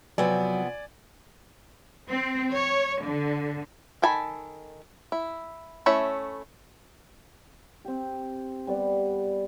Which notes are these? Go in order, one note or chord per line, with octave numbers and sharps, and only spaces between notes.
C3 F3 F#3 B3 D5 G#5
C4
C#5
D3
D#3 A4 G#5 A5 B5
E4
A3 C#4 E4 C#5 E5
C4 G4
G3 B3 D5